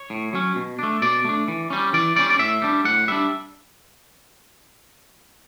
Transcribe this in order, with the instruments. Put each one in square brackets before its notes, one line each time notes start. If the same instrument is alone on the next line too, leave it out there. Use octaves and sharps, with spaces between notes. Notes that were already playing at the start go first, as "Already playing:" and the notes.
Already playing: [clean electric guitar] C#5
A2
F#3 C#4
B2
A3 D4
B2 D5
A3 D4
E3
G3 C#4
E3 D5
G3 C#4 D5
D5
A2 E5
G3 D4
A2 F#5
G3 D4 E5